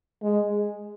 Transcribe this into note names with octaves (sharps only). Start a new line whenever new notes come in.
G#3